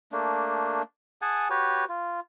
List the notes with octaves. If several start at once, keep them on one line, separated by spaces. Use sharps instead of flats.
A3 A#3 D4
G#4 F#5 G#5 A5
F#4 G4 B4 C#5
F4